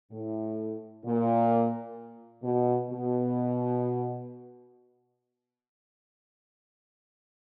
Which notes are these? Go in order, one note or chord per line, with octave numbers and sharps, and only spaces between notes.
A2
A#2
B2
B2